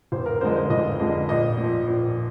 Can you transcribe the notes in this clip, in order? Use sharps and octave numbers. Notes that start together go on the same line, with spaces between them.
F1 C5
A#4
F2 D3 G#3 C5
C5
F1 D#5
F2 D3 G#3
A#1 D#5
A#2 F3
A#1